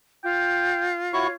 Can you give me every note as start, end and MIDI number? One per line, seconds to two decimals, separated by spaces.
0.24 1.35 65
0.24 0.93 79
1.13 1.27 64
1.13 1.27 66
1.13 1.32 73
1.13 1.27 85